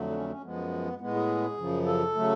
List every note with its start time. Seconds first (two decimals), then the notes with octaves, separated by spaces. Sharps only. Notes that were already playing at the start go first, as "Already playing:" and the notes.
Already playing: F2 D3 F#3 A3
0.10 D4
0.15 C#4
0.29 C#4
0.43 F#2 F3 G#3 B3
1.00 A2 G#3 B3
1.15 G#4
1.57 F#2 C#3 F3
1.86 A4
2.15 C#3 F#3 A3